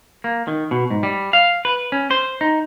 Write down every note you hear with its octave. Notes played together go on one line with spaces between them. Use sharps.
A#3
D#3
B2
G#2
G3
F5
B4
C#4
C5
D#4